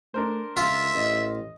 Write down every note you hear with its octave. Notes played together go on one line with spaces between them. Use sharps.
A3 D4 A#4 C5
C#2 F4 E5
A1 D#5